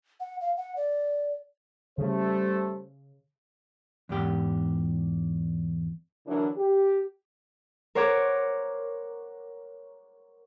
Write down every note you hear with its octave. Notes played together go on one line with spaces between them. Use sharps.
F#5
F5
F#5
D5
C#3 G3 A3 C5
E2 G#2 G4
D3 E3 F#3 D4 E4 A#4
G4
A#4 C5 C#5 F#5 D6 G#6